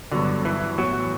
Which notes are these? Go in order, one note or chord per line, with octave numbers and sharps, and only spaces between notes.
G2 D3 F#3 B3 F#4
E3
A2 E3 F#3 B3